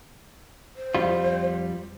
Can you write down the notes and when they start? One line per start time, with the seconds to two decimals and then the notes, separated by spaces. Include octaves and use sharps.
0.76 C5
0.95 F2 G3 F4